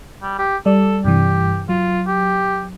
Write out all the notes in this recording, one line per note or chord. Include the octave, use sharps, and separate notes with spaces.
G3
G4
G3 A4 D5
G2 C3 E3 G4
F#3 F4
G4